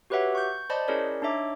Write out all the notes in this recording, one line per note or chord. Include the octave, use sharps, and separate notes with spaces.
F#4 G4 B4 C#5 E5 F#5
C#6 G6
C5 D5 D#5 A5 B5
C#4 E4 G#4 A#4 C#5 D5
D4 D#4 C#5 E5 D6